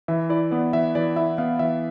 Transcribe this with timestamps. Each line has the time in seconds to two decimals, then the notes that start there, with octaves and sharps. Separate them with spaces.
0.08 E3 E5
0.30 E4 D5
0.51 B3 D5
0.73 E3 E5
0.95 E3 D5
1.16 E4 E5
1.38 B3 F5
1.59 E3 E5